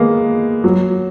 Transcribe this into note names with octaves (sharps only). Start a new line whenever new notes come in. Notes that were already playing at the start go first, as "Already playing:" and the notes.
Already playing: G#3 A#3 B3
F#3